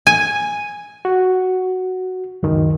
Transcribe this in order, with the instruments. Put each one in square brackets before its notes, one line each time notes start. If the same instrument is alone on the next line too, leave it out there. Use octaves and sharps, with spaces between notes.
[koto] G#5
[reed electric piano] F#4
C#2 F#2 D#3